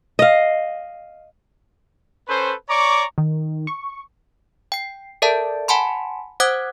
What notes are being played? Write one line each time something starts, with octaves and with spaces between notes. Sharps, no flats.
D#5 F5
C#4 A4 B4 C5
C#5 D5 A#5 C#6 D6
D#3
C#6
G5 C7
A4 A#4 D5 E5 A5
F#5 G#5 A5 B5 C6
C5 F#5 D6 D#6 F#6 G#6